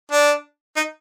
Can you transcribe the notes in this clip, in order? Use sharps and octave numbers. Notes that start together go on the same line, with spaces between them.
D4
D#4